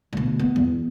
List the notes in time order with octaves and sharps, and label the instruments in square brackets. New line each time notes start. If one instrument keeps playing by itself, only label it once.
[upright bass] D2 B2
B3
E2